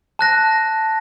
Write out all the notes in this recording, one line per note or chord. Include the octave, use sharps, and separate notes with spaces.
A5 F#6 A#6